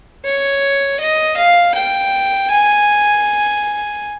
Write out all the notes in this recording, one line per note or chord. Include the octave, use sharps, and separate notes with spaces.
C#5
D#5
F5
G5
G#5